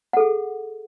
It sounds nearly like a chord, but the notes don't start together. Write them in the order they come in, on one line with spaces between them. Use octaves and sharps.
F#5 A4 G#4